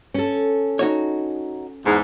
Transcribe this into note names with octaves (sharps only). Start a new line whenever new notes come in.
C#4 A4
D#4 F#4 C#5
E2 G#2